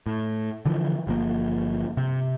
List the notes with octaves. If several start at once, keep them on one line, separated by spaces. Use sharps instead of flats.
A2
D3 E3 F3
G1 F3 A#3
C3